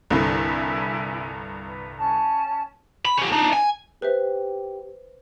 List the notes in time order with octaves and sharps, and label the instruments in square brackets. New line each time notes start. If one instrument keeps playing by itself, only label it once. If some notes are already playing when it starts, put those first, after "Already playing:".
[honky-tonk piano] C2 G2 D3 [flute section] E4 G#5
[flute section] B4
C#4 A5
[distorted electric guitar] B5
C#4 G4
D4 D#4
G#5
[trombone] G4 [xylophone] B4 C5 E5